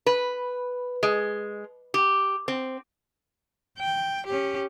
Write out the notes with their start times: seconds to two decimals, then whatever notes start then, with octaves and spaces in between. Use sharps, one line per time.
0.06 B4
1.03 G#3
1.94 G4
2.48 C4
3.78 G5
4.27 C#4 G4